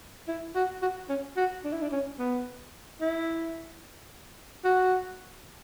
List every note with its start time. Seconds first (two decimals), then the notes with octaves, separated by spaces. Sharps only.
0.28 E4
0.55 F#4
0.82 F#4
1.09 C#4
1.37 F#4
1.64 D4
1.73 E4
1.82 D4
1.92 C#4
2.19 B3
3.01 E4
4.65 F#4